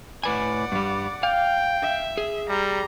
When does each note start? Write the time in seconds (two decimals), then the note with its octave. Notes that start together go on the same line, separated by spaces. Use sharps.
0.24 A2 B4 D5 F#5 G#5
0.72 G2 G3
1.23 F5 G5
1.82 E5
2.17 G#4
2.49 G3 A#5 C6